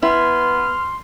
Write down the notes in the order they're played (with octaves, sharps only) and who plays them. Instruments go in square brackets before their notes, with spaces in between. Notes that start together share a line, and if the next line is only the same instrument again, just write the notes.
[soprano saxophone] B3 [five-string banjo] E4 [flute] C6 [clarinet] F6